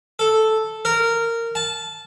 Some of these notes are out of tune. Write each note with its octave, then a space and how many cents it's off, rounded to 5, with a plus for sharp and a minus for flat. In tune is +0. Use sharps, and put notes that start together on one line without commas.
A4 -5
A#4 -15
A5 -15